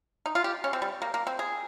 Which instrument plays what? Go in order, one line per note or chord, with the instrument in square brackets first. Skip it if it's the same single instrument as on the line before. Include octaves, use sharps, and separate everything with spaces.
[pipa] D#4
F4
G4
C#4
C4
G3
A#3
A#3
C4
G#4